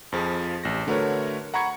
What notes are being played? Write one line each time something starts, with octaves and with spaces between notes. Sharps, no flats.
F2 F3 G#4
A1 A#6
D3 A3 F#4 A#4 B4 C#5
F#5 A#5 B5 C#6 G#6 C#7